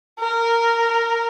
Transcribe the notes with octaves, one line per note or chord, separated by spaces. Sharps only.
A#4